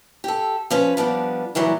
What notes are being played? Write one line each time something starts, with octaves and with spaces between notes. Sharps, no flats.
G4 A4
F3 C#4 B4
F3 G3 B3 D4
A#2 E3 F#3 G3